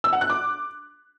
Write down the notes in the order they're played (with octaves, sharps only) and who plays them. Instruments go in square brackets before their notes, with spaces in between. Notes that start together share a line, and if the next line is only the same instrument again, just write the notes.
[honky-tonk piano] E6
F#5
F#6
D6